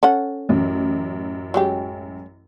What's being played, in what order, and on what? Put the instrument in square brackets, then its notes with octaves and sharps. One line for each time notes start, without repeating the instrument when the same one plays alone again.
[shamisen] C#4 A4 F#5
[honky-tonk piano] A1 F#2
[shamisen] F#3 G#3 G4